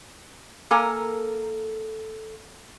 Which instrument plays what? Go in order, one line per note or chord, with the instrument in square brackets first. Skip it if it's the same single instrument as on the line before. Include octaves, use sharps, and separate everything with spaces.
[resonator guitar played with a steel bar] A#3 A4 A#4 G#5 A#5